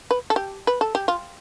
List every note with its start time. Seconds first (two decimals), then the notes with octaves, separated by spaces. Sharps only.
0.11 B4
0.30 A4
0.36 G4
0.67 B4
0.81 A4
0.95 G4
1.08 F4